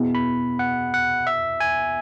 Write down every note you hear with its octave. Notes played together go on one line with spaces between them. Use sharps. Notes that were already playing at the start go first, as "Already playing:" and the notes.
Already playing: B2 B3 E4 G#4
B5
F#5
F#5
E5
G#5